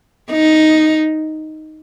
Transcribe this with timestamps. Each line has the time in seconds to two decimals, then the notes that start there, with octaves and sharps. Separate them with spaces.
0.31 D#4